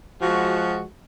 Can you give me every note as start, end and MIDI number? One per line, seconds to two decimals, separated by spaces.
0.21 0.82 53
0.21 0.82 56
0.21 0.82 66